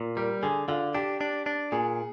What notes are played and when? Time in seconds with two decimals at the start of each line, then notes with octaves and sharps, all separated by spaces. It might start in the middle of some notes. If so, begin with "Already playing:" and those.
Already playing: A#2
0.17 G3 A#4
0.43 D3 G#4
0.68 D3 F4
0.94 D4 G4
1.21 D4
1.46 D4
1.72 A#2 G#4